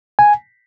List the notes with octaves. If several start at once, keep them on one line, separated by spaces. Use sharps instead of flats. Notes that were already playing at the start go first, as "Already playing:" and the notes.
G#5